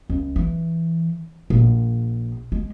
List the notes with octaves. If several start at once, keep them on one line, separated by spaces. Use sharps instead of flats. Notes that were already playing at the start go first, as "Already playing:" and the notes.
C#2
E3
A#1
G#3